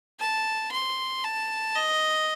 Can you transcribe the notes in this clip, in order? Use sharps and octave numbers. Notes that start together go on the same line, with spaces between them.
A5
C6
A5
D#5